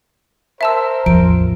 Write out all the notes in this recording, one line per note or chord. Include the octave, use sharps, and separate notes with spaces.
A#4 C5 E5 A5 E6
A1 E2 F3 D7